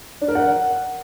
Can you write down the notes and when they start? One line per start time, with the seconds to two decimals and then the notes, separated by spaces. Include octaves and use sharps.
0.21 D4
0.28 A#4
0.35 F#5